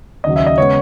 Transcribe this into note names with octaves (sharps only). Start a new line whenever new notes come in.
D#2 C#3 F#3 D#5
E5
D#5
C#3 G#3 B3 C#5